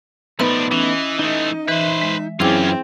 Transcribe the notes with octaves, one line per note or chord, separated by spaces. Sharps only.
F3 A3 B3 D4 D#4 B4 B5
E3 C#4 D#5
E3 A3 D#4
E3 B4 C5 E5
G#3
F#2 E3 C4 C#4 E4 F4 G#4 D6